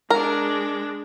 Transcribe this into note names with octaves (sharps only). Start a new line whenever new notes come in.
G#3 D4 A#4